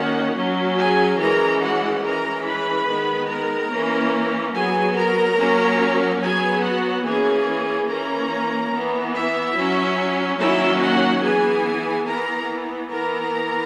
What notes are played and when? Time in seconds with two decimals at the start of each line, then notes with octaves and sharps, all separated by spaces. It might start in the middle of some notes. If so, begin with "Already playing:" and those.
Already playing: D#3 A#3 C#4 F#4 F#5
0.37 F#3 C#4
0.78 G#4 G#5
1.20 E3 G#3 C#4 A#4 A#5
1.62 F#4 F#5
2.03 E3 G#3 C#4 A#4 A#5
2.45 B4 B5
2.88 D#3 G#3 B3
3.29 A#4 A#5
3.71 E3 A#3 C#4
4.54 F#3 B3 G#4 G#5
4.96 A#4 A#5
5.38 F#3 A#3 C#4
6.22 F#3 B3 G#4 G#5
6.63 F#4 F#5
7.05 E3 A#3 C#4 G#4 G#5
7.89 E3 A#3 C#4 A#4 A#5
8.73 E3 B3
9.14 E4 E5
9.56 F#3 C#4
10.39 D#3 F#3 A#3 C#4 E4 E5
10.81 F#4 F#5
11.23 E3 B3 G#4 G#5
12.07 E3 B3 A#4 A#5
12.90 E3 B3 A#4 A#5